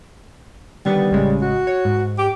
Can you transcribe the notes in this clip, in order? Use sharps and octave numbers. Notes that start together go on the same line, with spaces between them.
D3 D#3 G3 B3
A1 C#3 G#3
F#4
C#5
G#2
G4